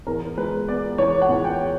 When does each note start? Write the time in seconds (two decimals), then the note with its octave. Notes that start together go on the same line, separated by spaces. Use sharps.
0.07 E2 A#4
0.37 G#3 B4
0.68 B3 D5
0.98 E2 C#5
1.22 F#5
1.29 E2
1.44 G5